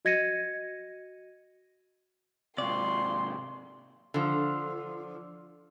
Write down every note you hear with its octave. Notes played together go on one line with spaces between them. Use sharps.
F#4 D#5 G#6 A#6 C#7 D#7
G#2 C3 F4 D5 F5 C6 C#6
D3 F3